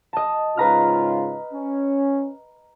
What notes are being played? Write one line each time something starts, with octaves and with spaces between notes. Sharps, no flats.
D#5 A5
G#2 C#3 F4 B4 A#5 F6
C#4